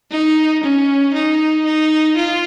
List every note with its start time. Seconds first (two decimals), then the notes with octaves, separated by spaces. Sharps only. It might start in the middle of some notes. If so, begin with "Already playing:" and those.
0.11 D#4
0.63 C#4
1.13 D#4
1.65 D#4
2.16 F4